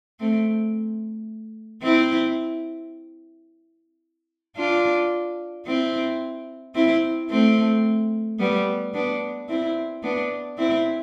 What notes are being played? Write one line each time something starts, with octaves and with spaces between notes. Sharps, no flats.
A3 C4
C4 E4
D4 F4
C4 E4
C4 E4
A3 C4
G3 B3
B3 D4
C4 E4
B3 D4
C4 E4